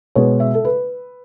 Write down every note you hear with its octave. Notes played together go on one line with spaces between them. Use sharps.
B2 G#3 B3 C#5
E5
A4
B4